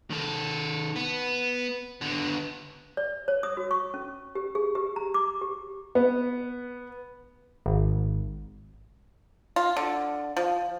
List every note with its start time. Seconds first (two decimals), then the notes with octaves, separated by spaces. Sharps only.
0.10 D#3 A4
0.96 B3
2.01 D3 B3
2.97 D5
3.28 C#5
3.43 D#6
3.57 F#4
3.71 C#6
3.94 C#4
4.35 G4
4.55 G#4
4.75 G4
4.96 A#5
5.14 D6
5.41 G4
5.95 B3
7.66 G#1
9.56 F4
9.77 D3
10.37 F3